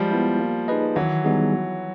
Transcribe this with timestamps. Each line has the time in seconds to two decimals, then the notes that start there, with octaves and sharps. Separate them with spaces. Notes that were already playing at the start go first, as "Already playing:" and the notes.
Already playing: F3 G3 G#3
0.11 B3 E4
0.40 A#3
0.68 D#4 G#4 B4 D#5
0.96 D#3 E3 F#3
1.24 G3 B3 D#4 G#4
1.53 F#3